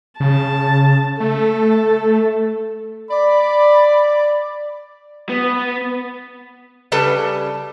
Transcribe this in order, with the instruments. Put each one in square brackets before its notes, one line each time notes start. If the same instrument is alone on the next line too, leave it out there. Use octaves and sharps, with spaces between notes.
[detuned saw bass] C#3 [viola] A5
[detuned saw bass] A3 [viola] A4
[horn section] D5 [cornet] B5
[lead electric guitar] B3
[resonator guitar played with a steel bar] C#3 G3 A4 B4 A5